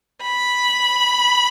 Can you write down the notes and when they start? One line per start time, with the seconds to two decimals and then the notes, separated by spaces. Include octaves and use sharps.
0.22 B5